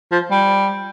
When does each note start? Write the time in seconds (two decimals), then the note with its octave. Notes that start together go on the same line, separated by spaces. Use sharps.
0.12 F3
0.31 G3